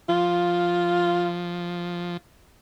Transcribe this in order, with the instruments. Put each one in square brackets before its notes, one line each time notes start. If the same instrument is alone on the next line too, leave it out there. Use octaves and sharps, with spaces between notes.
[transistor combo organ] F3 [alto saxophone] F4